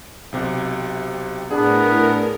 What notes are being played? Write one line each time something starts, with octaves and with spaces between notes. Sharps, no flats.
B1 C3 G4
A2 B3 D4 G#4 A#4